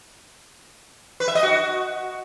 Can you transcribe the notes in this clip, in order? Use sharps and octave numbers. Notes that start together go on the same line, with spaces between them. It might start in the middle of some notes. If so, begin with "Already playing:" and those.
B4
E5
D#5
F#4